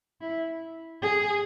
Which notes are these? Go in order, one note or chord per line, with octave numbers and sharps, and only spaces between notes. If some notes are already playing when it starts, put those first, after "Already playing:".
E4
G#4